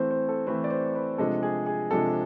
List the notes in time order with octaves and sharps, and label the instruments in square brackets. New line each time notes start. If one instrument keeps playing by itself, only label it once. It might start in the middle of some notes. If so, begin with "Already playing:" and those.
Already playing: [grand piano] E3 A3 C4 C5
C5
A4
E3 A3 C4 B4
D5
C5
B4
C3 F3 G#3 D4 A4
G#4
G#4
C3 F3 G#3 D4 A4